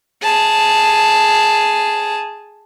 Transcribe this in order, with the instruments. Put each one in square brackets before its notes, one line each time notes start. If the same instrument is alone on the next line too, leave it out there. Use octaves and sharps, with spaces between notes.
[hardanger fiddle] G#4 A5